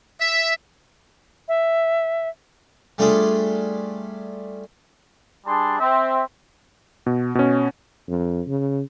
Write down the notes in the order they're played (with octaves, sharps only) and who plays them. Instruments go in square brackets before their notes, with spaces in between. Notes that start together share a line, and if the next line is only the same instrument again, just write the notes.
[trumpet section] E5
[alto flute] E5
[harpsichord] G3 A3 D4 F4 G#4 A4
[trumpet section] G3 D4 G#4 A5 C6
C4 E5
[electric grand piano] B2
B2 C#4
[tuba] F2
C#3